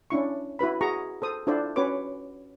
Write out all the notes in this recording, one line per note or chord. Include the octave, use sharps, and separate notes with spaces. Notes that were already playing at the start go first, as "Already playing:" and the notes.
C#4 D4 E4 C#6
E4 F#4 B4 B5
F#4 G#4 A#5 C#6
A4 C5 D#6
D4 E4 F4 A4 C5 D5
C#4 F#4 B4 C#5 D6